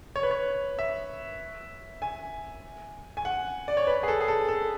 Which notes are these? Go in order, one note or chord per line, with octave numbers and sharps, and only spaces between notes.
C#5
B4
C#5
E5
G#5
G#5
F#5
D5
C#5
B4
G#4
A4
G#4
A4
A4